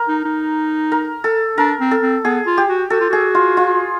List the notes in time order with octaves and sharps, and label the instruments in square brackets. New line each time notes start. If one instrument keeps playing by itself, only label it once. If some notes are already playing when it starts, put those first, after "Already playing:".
Already playing: [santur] A#4
[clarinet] D#4
D#4
[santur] A#4
A4
[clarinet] D4 [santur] A#4
[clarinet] C4
[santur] A4
[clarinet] C4
[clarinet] B3 [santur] G#4
[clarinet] F4
[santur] G4
[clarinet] F#4
[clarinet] F#4 [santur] A4
[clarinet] F4
[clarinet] F#4 [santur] G#4
[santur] F4
F4